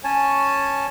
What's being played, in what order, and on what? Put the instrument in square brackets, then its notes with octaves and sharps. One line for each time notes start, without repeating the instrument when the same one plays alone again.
[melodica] C#4 C#5 G#5 A5